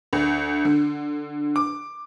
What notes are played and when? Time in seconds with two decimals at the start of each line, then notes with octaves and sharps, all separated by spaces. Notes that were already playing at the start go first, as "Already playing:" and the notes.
0.13 D2
0.65 D3
1.56 D6